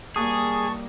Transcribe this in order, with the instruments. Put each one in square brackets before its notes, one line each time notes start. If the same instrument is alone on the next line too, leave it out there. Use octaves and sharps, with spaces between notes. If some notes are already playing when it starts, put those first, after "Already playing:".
[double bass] G3 A#3 [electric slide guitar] G#4 [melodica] A5 C#6 [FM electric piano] D#6